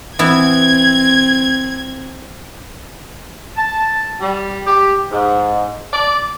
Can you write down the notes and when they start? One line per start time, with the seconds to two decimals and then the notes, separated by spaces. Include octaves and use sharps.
0.19 E3 B3 C4 E4 G#6
3.57 A5
4.19 G3
4.66 G4
5.11 G#2
5.93 D5